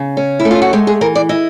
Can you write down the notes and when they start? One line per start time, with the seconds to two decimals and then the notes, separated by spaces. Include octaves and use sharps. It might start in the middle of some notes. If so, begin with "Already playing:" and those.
Already playing: C#3
0.17 C#4
0.40 E4
0.45 A3
0.51 F4
0.62 F#4
0.73 G#3 G4
0.87 G#4
1.01 E3 A#4
1.15 D5
1.29 E4 D#5